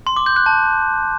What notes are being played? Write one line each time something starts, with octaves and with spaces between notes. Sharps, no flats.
C6
D6
G6
F#6
A5